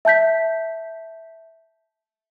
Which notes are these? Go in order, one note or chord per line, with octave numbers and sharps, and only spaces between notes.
E5 A5 G6 B6